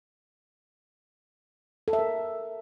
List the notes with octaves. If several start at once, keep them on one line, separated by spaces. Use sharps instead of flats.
A4
E5
A#4